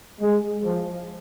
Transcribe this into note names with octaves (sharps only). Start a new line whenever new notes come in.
G#3
F3